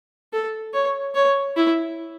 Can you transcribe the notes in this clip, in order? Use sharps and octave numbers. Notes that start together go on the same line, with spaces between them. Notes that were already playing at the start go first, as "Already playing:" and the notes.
A4
C#5
C#5
E4